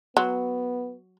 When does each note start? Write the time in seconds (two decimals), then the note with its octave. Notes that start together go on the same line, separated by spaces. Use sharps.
0.17 F#3 B3